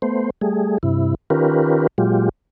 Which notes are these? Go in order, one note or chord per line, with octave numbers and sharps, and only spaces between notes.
A3 B3 C5
G3 A3 G#4
G2 C3 E4
D#3 C#4 F4 G4 A#4 B4
A#2 F#3 G#3 F4 G4